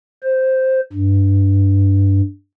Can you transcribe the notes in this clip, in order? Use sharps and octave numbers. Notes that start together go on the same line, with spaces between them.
C5
G2